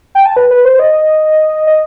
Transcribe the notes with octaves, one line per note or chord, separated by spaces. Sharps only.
G5
A5
B4
B4
C5
D#5
D#5